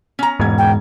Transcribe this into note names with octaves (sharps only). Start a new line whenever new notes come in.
C#4 A#5
E1 G#2 G#6
G5